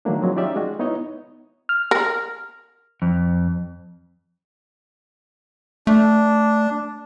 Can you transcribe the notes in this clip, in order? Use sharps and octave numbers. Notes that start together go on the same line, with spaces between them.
D#3 F#3 A3 A#3 D4
F3 F#3 G#3 C4
C#4 D#4 F4 G4 D5 E5
G#3 F#4
B3 D#4 E4 C#5 D#5
F6
A#4
F2
A3 D4